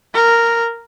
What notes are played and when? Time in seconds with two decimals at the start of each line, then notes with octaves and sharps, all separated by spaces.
0.14 A#4